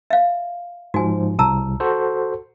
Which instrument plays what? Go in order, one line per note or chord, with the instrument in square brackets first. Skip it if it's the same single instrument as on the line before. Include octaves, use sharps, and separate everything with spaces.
[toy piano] E5 F5
[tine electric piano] G#2 F3 [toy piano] F#4 G#5
[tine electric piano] C2 [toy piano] A5 A#5 E6
[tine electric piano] F#4 A4 C5